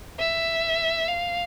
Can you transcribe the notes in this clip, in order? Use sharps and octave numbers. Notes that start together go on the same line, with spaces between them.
E5
F5